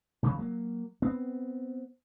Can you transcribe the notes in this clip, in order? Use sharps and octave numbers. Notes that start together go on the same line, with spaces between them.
E1 C#3 E3
F#3 A#3
B3 C4